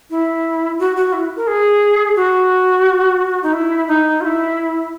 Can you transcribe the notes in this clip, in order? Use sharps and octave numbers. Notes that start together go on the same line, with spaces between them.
E4
F#4
F#4
E4
A#4
G#4
F#4
D#4
E4
D#4
F#4
E4